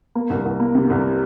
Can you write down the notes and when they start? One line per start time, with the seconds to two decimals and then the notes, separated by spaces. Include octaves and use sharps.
0.15 A#3
0.30 C2
0.45 C2
0.60 A#3
0.75 C3
0.90 C2